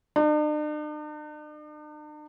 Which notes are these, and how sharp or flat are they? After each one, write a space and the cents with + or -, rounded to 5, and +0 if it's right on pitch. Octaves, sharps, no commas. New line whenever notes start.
D4 +45